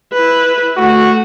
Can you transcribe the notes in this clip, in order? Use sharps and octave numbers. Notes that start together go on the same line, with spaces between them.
E4 B4
A3 F#4